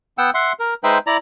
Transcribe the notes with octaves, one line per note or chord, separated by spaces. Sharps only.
B3 F#5 G5 E6
E5 F#5 C6
A#4
G#3 D#4 B4 C5 E5 G5
E4 D5 A#5